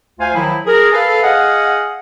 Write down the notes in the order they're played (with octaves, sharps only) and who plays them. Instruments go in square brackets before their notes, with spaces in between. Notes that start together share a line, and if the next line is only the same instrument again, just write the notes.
[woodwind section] D2 F4 C5 F5 G#5
D#3 F3 F#3 E4
G#4 A#4
A4 B4 F5
G#4 D#5 F5 F#5